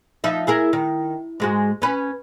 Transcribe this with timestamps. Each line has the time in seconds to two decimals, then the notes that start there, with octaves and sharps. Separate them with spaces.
0.24 F3 D#4 E5
0.47 E4 G#4 A#4
0.73 D#3
1.40 G#2 G#3 F#4
1.82 C#4 B4